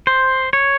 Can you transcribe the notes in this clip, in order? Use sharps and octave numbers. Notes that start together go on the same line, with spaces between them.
C5
C#5